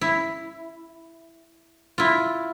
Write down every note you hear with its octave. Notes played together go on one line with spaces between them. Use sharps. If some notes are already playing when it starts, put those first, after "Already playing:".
E4
E4 F4